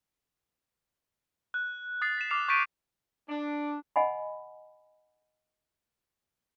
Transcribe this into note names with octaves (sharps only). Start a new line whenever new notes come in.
F#6
D#6 A6 C7
B6 E7
D6 F6 C7 F7
C#6 G6 A6 B6 D7 D#7
D4
D#5 F#5 G#5 B5